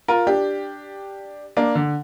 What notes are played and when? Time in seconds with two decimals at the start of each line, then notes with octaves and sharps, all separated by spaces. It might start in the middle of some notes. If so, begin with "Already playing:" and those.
0.08 F4 A#4
0.27 D4 G4
1.57 A#3 D4
1.75 D3